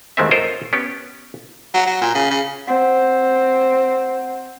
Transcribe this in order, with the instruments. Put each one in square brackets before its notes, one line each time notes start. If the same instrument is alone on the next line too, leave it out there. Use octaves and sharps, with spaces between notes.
[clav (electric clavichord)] D#2 D#3 G#3 A3 C4 E5
F4 A4 A#4 C5 C#5 D#5
B3 C#4 G4
[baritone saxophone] F#3
F#3
A#2
C#3
C#3
[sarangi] C4 [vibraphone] F#5